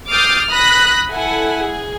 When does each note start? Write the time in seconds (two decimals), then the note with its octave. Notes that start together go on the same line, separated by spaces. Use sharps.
0.12 D6 D#6 F6 G6 A6 C7
0.51 B5 D#6 F#6 A#6 B6
1.11 E4 A4 F#5 G#5
1.61 G#4